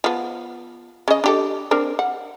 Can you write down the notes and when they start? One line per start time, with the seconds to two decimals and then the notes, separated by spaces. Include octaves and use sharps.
0.04 F3 B3
1.08 C#3 D#5
1.24 D4 G4 A4
1.71 C4 D4 A#4
1.99 F#5